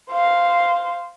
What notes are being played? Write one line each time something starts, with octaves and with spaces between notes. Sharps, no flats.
C5 F5